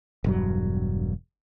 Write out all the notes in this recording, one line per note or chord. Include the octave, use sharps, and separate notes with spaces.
E1 G2 F#3